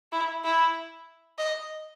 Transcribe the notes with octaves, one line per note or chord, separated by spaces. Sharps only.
E4
E4
D#5